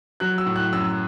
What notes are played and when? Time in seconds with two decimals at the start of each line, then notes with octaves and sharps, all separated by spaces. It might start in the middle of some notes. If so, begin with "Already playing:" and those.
0.20 F#3 F#6
0.38 E6
0.46 A2
0.56 F#6
0.73 F#2 E6